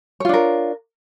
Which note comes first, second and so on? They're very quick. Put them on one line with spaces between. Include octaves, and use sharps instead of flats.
C#5 F4 D4 A#4